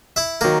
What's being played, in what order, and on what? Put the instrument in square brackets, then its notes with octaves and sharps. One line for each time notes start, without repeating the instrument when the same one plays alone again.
[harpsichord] E4 E5
[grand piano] D#3 F#3 [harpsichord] A#3 A#4